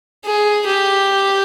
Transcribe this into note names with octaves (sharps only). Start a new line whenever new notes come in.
G#4
G4